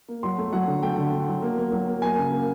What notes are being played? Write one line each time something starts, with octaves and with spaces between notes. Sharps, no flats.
A#3
F#3 C6
A3
F#3 F#5
D3
A3 G5
D3
D3
F#3
A#3
A#3
F#3
A#3
A#3 G#5
C#3
A#3